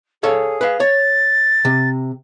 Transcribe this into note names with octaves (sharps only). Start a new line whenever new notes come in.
G#4 A4 C#5 F5
B4 F5
C#5 A6
C3